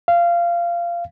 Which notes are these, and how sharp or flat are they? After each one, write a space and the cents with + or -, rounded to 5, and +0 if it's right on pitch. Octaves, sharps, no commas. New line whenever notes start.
F5 -20